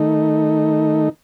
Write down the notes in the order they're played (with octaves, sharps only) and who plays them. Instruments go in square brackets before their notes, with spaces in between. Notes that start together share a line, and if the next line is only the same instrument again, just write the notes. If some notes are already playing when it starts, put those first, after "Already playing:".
Already playing: [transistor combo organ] D#3 A3 D#4